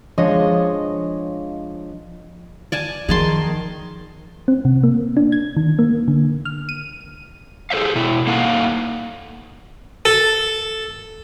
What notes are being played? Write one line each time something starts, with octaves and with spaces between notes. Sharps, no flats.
F3 G#3 D4 C#5 D#5
D5 G#5 A5
D#3 F3 G#4 A5 C6
C4
C3
A#3
D4
G#6
D#3
A#3
D3
F6
D#7
G#4 A4 C5 E5 F5
B2 E4
A#3 D#4 A4 F5 F#5
A4